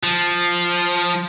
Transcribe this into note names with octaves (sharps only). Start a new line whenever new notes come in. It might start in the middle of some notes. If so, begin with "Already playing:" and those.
F3